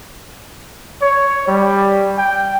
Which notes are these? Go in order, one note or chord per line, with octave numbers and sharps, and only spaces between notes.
C#5
G3
G5